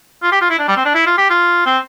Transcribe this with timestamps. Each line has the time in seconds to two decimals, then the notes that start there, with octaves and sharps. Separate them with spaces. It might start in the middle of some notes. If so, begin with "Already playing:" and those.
0.23 F4
0.32 G4
0.41 F4
0.50 E4
0.59 D4
0.68 G3
0.76 C4
0.85 D4
0.94 E4
1.06 F4
1.17 G4
1.30 F4
1.66 C4